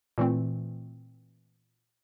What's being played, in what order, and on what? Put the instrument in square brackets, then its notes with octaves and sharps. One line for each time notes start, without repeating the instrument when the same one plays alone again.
[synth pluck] A#2 E3 A3 C4